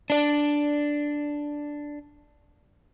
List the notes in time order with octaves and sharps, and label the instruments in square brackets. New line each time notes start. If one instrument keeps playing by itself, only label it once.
[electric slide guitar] D4 D5